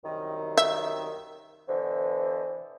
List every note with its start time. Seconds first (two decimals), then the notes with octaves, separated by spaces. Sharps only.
0.04 C2 F#2 D#3
0.57 E5
1.68 B2 D3 E3 C5